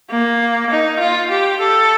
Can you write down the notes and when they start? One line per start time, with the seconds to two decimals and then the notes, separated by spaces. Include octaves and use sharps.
0.10 A#3
0.70 D#4
1.00 F4
1.30 G4
1.60 A4